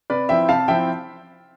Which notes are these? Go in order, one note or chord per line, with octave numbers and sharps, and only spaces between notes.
C3 B4 D5
F3 C4 E4 E5 G5
C3 F5 A5
F3 C4 E4 E5 G5